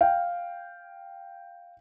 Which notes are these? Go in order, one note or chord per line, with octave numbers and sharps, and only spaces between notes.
F5 G5